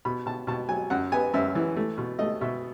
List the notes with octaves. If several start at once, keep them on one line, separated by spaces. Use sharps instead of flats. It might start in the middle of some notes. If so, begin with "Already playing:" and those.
B2 B5
B2 A5
B2 A5
F#3 G#5
F#2 F#5
B3 G#5
F#2 E5
E3
A3
B2
A3 D#5
B2 E5